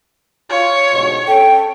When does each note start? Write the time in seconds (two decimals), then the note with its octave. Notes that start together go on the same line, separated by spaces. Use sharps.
0.50 F4 C#5
0.92 D2 G#2 B2
1.27 C#4 A4 G5